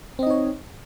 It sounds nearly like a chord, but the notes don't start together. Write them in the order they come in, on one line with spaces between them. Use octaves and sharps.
C4 D#5 D#4 C#5